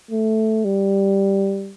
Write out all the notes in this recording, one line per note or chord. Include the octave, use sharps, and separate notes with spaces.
A3
G3